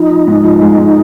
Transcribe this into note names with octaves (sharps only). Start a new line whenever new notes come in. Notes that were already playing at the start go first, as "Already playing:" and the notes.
Already playing: F3 D#4
F3
G#2
F3
G#3
G#2